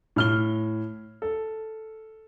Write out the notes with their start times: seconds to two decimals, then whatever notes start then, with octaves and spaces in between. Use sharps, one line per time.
0.16 A2 F6 G7
1.22 A4